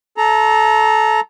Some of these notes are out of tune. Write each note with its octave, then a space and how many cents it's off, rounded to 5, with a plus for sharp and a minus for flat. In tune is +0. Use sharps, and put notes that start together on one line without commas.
A4 -20 A#5 +0